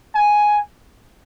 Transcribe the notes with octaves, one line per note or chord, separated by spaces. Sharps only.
G#5